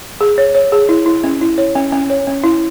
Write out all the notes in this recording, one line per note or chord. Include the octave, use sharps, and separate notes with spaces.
G#4
C#5
C#5
G#4
E4
E4
C#4
E4
C#5
C#4
C#4
C#5
C#4
E4